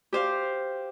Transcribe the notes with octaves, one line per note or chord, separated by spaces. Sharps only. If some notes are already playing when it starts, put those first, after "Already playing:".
G4 C5 F5